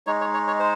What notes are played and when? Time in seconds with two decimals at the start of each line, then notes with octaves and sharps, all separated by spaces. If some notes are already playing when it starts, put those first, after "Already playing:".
0.07 G#3 D#4 C#5
0.21 C#5
0.34 C#5
0.47 C#5
0.59 C5